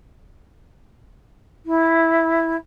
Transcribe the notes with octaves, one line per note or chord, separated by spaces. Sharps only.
E4